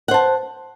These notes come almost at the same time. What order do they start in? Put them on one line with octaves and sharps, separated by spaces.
F#5 C5 A5